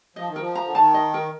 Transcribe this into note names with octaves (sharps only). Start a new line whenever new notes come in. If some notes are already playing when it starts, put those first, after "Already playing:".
F3 D#5
D#3
F3 A#4
A#5
D3
D#3 A5
D#5
A#4